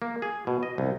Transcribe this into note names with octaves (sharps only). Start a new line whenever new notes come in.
A#3
G#4
B2
D#5
C2